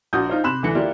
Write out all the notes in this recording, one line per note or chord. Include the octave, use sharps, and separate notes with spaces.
A#1 F#4 D#6 G6
D#4 F4 C5
C3 B5 C6 F#6 E7
D2 D3 E3 C#7
A#3 E4 F4 G4 D5